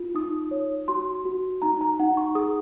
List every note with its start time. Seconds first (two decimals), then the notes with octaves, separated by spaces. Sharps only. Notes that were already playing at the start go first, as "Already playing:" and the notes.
Already playing: F4
0.15 D#4 D#6
0.51 C#5
0.88 F#4 C6
1.25 F#4
1.62 D#4 A#5
1.81 A#5
1.99 D#4 F#5
2.17 C#6
2.35 G#4 D#6